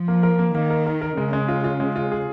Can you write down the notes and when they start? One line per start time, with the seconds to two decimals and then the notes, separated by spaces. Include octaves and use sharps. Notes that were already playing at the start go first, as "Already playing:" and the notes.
Already playing: F3
0.08 A#3
0.23 A#4
0.39 A#3
0.54 D#3 A#3
0.70 A#4
0.86 A#4
1.01 A#4
1.17 C#3 G#3
1.33 G#3
1.48 F4
1.64 F4
1.80 G#3
1.96 F4
2.12 G#4